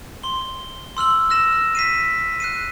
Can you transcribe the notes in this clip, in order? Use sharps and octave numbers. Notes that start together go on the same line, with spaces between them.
C6 G7
C6 E6 F6 F#7
E6 F6 A#6 E7
B6 C7 D#7
F#6 C7 D#7